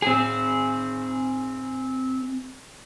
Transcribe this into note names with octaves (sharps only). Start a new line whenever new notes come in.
C4 G#4